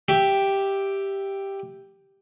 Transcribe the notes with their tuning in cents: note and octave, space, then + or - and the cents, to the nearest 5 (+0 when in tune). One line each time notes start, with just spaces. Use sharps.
G4 +0 E5 +0